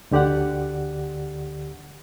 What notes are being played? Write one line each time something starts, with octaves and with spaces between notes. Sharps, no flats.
D2 D3 G4 D5 F#5